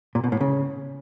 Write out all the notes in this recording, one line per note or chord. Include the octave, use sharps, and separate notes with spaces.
A#2
B2
A2
C#3